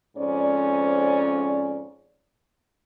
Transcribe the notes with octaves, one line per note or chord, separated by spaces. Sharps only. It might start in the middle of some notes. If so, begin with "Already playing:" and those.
F2 G#2 C#4 D5